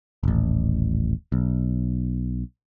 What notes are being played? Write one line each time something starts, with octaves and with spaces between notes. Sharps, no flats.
D#1 A1
B1